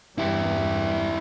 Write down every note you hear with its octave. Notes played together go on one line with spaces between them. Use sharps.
E2 G2 E4 G4